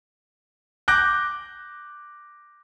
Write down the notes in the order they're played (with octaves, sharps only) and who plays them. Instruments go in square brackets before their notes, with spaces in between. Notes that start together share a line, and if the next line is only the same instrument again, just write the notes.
[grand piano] D6 F#6 G6 A#6